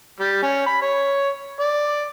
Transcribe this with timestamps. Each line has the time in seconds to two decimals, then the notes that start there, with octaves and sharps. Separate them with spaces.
0.20 G3
0.43 C#4
0.67 B5
0.82 C#5
1.60 D5